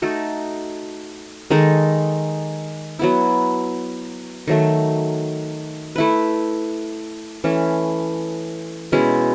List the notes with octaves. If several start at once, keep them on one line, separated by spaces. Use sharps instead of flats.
A3 D#4 F#4 A4
D#3 G#3 D#4 A4
F#3 B3 E4
D#3 F#3 A3
A3 E4 B4
E3 A3 C#4
B2 G#3 C#4 E4